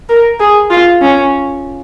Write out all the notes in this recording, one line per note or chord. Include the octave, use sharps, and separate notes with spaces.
A#4
G#4
F4
C#4